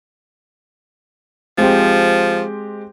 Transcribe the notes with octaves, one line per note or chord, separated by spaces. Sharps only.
F3 G#3 C4 G4